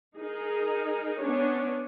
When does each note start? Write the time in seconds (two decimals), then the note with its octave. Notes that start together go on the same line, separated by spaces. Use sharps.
0.17 D#4 G#4 A#4
1.18 B3 C#4 D4 C#5